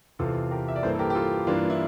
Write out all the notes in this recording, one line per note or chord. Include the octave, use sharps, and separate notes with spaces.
E2 C3 E3 F4 A4
G4 A#4
E5
D5
G2 E3 A#3 A4 C5
A4
G4 A#4
G4
F4 A4
G2 E3 A#3 D4 F4
E4